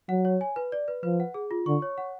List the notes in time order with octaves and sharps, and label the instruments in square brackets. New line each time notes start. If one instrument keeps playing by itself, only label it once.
[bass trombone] F#3 [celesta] F#5
[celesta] C#5
G#5
B4
D5
B4
[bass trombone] F3 [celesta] B4
[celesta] F#5
G#4
F4
[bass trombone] D3 [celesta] C#6
[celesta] C#5
F#5